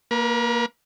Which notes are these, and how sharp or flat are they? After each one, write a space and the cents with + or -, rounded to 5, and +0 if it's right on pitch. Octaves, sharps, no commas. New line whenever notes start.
A#3 +0 B4 -40